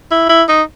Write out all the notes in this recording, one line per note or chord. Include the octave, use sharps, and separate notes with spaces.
E4
E4
D#4